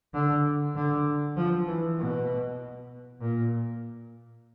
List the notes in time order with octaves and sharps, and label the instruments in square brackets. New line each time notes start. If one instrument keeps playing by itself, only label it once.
[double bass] D3
D3
F3
E3
B2
A#2